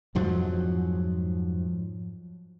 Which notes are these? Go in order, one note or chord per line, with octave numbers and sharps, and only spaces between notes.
F2 G#2 F3 F#3